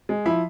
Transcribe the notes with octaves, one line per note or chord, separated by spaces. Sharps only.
G#3
F3 E4